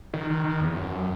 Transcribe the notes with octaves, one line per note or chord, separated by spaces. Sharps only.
D#3
D#3
D#3
E2
F#2